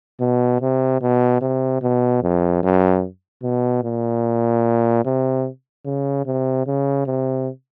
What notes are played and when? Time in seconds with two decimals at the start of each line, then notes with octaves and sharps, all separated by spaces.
0.20 B2
0.61 C3
1.01 B2
1.41 C3
1.82 B2
2.22 F2
2.63 F#2
3.43 B2
3.83 A#2
5.05 C3
5.85 C#3
6.26 C3
6.66 C#3
7.06 C3